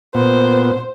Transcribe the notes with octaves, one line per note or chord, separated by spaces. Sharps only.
A#2 B3 C5